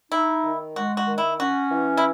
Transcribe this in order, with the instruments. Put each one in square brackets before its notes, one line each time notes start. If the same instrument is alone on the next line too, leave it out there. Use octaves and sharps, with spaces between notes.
[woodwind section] D#4 [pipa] E4
[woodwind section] D#3
[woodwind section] G#3 [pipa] F#4
[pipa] F#4
[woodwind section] D#3
[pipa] E4
[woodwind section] C#4 [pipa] F#4
[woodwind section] E3
[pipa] E4